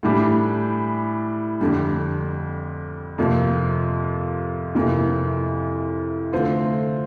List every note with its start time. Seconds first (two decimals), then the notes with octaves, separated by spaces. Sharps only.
0.03 A2 E3 G3 D4 G4
1.61 F2 D3 G3 D4
3.18 F2 C3 F3 A#3
4.75 F2 C3 E3 A#3
6.33 D3 A3 C4 F4